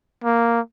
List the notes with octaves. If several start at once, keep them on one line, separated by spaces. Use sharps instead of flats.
A#3